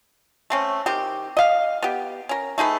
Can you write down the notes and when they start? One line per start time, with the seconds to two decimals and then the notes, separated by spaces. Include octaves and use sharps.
0.50 A3 C4 C#4
0.86 D#3 C4 G4
1.37 D#5 F5
1.83 B3 G4
2.29 C#4 A#4
2.58 A3 D#4 G#4 B4